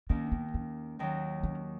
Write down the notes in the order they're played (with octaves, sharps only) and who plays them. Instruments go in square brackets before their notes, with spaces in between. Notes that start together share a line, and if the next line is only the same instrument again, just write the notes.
[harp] D#2 D#3 A#3 [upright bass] C#4
[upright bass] B3
C#4
[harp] D#2 D#3 F#3
[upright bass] C#4